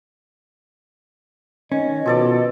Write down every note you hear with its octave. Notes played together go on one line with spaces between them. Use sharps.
D#3 C#4 D#5
B2 F3 A4 D5